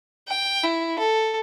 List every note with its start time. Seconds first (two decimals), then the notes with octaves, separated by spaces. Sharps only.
0.28 G5
0.64 E4
0.99 A4